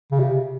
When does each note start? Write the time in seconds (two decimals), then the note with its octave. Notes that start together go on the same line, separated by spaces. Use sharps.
0.12 C#3
0.20 C3